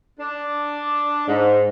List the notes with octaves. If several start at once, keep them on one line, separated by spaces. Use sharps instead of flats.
D4
G#2